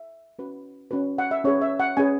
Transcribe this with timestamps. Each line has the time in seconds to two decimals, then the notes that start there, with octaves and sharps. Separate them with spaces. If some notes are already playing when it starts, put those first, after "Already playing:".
Already playing: E5
0.39 C#4 F#4 B4
0.91 C#4 F#4 B4
1.18 F#5
1.31 E5
1.44 C#4 G#4 B4 C#5
1.61 E5
1.80 F#5
1.97 C#4 G#4 B4 G#5